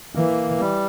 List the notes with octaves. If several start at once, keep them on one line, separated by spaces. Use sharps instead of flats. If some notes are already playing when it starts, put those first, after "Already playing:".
E3 A#3
G3